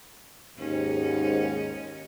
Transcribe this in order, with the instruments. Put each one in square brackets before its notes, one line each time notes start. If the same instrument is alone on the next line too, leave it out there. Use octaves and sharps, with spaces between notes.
[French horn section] D#2 G#2 [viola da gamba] C#4 D#4